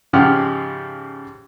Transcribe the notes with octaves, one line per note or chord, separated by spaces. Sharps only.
G#2 C#3 F3 G4 F#5 F6